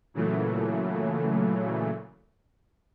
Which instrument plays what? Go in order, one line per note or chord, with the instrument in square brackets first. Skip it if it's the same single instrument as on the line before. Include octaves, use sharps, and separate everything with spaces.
[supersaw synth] A#2 C#3 E3 F#3 A3